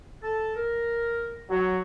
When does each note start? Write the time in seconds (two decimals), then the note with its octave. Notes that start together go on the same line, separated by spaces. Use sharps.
0.23 A4 A5
0.55 A#4
1.50 F#3